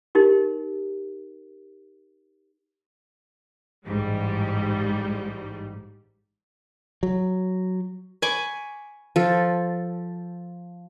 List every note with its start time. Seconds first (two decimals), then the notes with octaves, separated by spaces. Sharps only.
0.15 D#4 G4 A#4
3.87 A1 G#2 G3
7.03 F#3
8.22 G#5 B5 C#6 D6
9.16 F3 A4